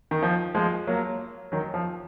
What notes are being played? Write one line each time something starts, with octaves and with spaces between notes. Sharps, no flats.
D#3
F3
F3 G#3
F#3 A#3
D#3 F#3
F3